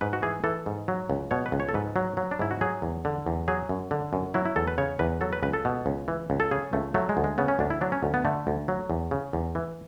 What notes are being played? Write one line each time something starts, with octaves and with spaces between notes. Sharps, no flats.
G#2 B4
F#4
E3 G#4
E3 A4
G#2
F#3
C#2
B2 C#5
B4
C#2
C#5
A4
G#2 B4
F#3
F#3
D4
G#2 E4
F#4
F#3 G#4
E2
D3
E2
F#3 G#4
F#2
D3
F#2
F#3 E4
E4
E2 A4
B4
C#3 C#5
E2 B4
F#3 A4
B4
C#2 B4
A4
B2
C#2
E3
C#2
A4
C#3 G#4
C#2 A3
F#3 A3
G#3
D2
G#3
C#3 B3
C#4
D2 D4
E4
F#3 D4
C#4
D2
B3
D3 A3
D2
F#3
E2
C#3
E2
E3